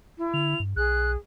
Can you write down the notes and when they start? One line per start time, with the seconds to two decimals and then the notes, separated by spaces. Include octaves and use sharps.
0.18 E4
0.34 D3 F7
0.60 G2
0.76 B1 G#4 F#6